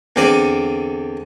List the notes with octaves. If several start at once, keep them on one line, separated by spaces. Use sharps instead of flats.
E2 D3 C4 D5